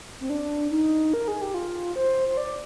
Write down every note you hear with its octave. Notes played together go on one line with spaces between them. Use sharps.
C4
D4
D#4
A#4
G#4
G4
F4
C5
C5
D5